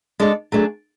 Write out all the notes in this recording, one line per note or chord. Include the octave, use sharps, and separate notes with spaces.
G#3 D4 A4 D5
F#3 A3 D4 G#4